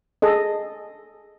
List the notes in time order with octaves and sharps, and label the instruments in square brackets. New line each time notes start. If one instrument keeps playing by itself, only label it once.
[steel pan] G#4 A4 D#5